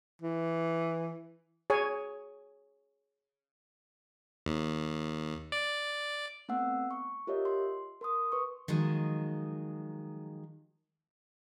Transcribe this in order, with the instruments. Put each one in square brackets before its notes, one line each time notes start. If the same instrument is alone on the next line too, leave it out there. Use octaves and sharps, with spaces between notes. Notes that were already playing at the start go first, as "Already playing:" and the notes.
[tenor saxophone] E3
[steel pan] G#4 C#5 G#5
[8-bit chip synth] D#2
D5
[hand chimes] A3 B3 C4 F#5 E6
C#6
F4 G4 A#4 C#5 D#5 E5
C6
A#4 C6 D#6
B4 C#6
[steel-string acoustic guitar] D#3 F3 F#3 G#3